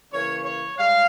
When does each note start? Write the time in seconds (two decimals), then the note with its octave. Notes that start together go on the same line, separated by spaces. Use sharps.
0.11 C#3 E3 A#3 C#5
0.44 C#5
0.77 G#2 G3 F5